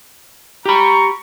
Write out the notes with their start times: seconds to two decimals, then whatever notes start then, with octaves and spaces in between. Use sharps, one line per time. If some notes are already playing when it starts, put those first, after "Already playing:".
0.66 G4 A#5 B5 C#6